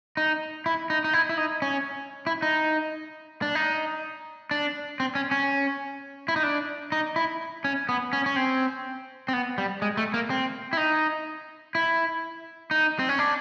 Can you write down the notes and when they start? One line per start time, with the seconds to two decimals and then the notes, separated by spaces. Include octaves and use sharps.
0.17 D#4
0.66 E4
0.90 D#4
1.04 D#4
1.13 E4
1.29 E4
1.37 D#4
1.62 C#4
2.27 E4
2.42 D#4
3.42 D4
3.55 D#4
4.51 D4
5.00 C4
5.15 C#4
5.31 C#4
6.28 E4
6.36 D#4
6.43 D4
6.92 D#4
7.16 E4
7.64 C#4
7.89 B3
8.13 C#4
8.26 C#4
8.36 C4
9.28 C4
9.33 B3
9.58 G3
9.82 G#3
9.97 A3
10.14 A#3
10.30 C4
10.73 E4
10.77 D#4
11.75 E4
12.71 D#4
12.99 C4
13.09 C#4
13.19 D4